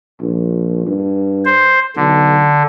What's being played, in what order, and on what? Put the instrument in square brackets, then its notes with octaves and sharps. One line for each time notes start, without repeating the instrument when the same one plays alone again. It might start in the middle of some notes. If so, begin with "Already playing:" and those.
[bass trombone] A#1
G2
[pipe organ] C5
[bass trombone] B1 [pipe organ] D3